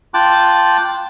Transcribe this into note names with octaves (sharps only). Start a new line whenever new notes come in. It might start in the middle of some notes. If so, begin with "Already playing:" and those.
F4 G5 A5 D6 F#6